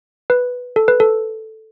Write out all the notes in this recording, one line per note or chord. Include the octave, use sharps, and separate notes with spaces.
B4
A4
B4
A4